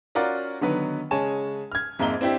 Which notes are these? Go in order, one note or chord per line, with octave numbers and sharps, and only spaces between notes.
C#4 F4 F#4 A#4 D5
D3 D#3 F#3 B3 B4
C#3 G#3 C#5 G#5 A5 E7
F6 G#6
F2 G#2 A#3 E5 A#5 G7
C4 D4 E4 G4 C5